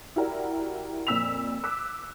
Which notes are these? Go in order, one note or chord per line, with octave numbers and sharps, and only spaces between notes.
E4 F#4 G4 A#4 D5
F2 A#2 C4 E6 B6 F7
D6 E6 F#6 B6